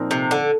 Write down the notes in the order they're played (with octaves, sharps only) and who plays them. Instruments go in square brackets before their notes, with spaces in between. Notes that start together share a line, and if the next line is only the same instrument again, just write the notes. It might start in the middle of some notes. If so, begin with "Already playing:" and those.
Already playing: [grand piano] A#2 F3 C4 D#4 A#4
[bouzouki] C3
D3